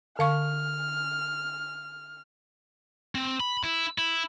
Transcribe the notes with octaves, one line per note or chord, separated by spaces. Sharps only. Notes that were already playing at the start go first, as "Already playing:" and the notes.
D3 F5 C#6 F6
C4
B5
E4
E4